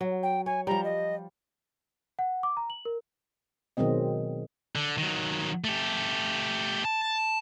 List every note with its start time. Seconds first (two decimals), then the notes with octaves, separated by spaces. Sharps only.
0.01 F#3
0.23 G5
0.46 C#5 G#5
0.67 F3 G3 A#5
0.84 D#5
2.19 F#5
2.43 D6
2.57 A#5
2.70 F#7
2.85 A#4
3.77 B2 D#3 F#3 G#3 C4 D#5
4.75 D3
4.98 D#3 F#3
5.64 A3 G4
6.85 A5